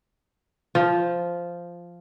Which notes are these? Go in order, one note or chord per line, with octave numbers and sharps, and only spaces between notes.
F3